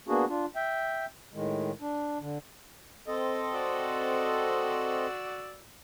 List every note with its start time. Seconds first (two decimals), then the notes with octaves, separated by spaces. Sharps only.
0.08 A#3 B3 D4 F#4 G#4
0.29 D4 F4
0.56 E5 G5
1.34 A2 D#3 G#3
1.81 D4
2.21 D3
3.08 C4 A4 D#5
3.54 F#4 D5 E6